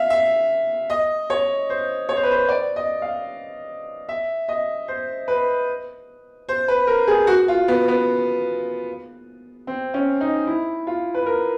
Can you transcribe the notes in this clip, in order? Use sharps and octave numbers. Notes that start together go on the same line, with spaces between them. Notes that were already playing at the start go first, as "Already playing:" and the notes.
Already playing: E5 F5
E5
D#5
C#5
C5
C#5
C5
B4
C5
D5
D#5
F5
E5
D#5
C5
B4
C5
B4
A#4
G#4
F#4
F4
B3
B3
C4
C#4
D#4
E4
F4
B4
A#4